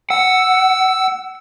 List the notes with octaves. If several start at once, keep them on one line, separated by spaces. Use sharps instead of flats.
F#5 E6